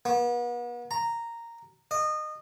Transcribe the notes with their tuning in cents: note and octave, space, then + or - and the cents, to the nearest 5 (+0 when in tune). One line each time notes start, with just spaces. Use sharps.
B3 -40
A#5 -5
D#5 -25